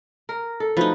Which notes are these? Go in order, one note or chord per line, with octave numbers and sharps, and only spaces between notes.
A#4
A4
F3 F#3 A3 D#4 B4